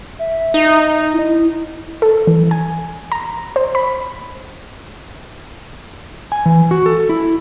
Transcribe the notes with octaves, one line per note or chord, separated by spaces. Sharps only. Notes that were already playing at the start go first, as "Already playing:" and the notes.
E5
D#4
E4
A4
E3
G#5
A#5
C5
B5
G#5
E3
F#4
A4
E4